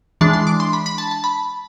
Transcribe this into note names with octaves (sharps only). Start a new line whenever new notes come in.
E3 G#3 D4 A5
C6
D6
C6
B5
B5
A5
A5
B5